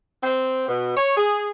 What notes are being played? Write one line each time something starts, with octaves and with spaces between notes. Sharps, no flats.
C4
B2
C#5
G#4